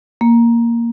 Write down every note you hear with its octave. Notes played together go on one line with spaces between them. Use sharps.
A#3